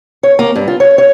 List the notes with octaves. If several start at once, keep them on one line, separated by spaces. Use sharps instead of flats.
C#5
A#3
G2
F4
C#5
C#5